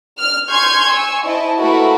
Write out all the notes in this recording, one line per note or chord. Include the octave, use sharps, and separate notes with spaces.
F6
G#5 C6 C#6 F6 G6 G#6
G#5 C#6 E6
E4 C5 D#5 A5
A3 A#3 E4 F#4 A#4 B4